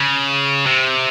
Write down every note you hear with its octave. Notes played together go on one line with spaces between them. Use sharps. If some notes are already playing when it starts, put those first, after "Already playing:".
Already playing: C#3
C3